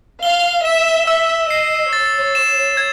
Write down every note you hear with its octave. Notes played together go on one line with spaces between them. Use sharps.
F5 G7
E5 E7
E5 E6
D#5 C7
C#5 A6
E7
G#6